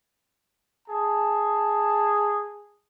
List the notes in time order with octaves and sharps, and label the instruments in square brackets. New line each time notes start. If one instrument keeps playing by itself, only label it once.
[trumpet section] G#4 A5